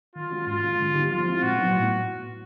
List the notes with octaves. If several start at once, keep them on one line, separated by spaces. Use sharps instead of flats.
D#3 F4
G#3 C#4 F#4
G#2 F4
D#3 G#3 C#4
D3
G3 B3 D#4 G4
F3 F4
G#3 C4 E4
A#2 F#4
F#3 B3 D#4
A2